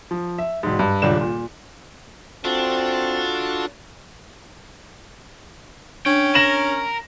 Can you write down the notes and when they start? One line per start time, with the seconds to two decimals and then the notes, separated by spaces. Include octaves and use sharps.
0.11 F3
0.38 E5
0.63 E1 G#2
0.79 G2
1.02 D#1 C#2 D4 E7
1.21 A#2
2.45 C4 D4 F4 F#4 A4
6.06 C#4 D4 G5
6.35 A#4 A#6 E7 F#7